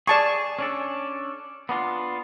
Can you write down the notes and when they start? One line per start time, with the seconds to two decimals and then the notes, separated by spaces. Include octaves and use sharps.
0.07 G#4 D5 A5 C#6
0.59 C#4 D4 A4
1.69 B3 D4 F4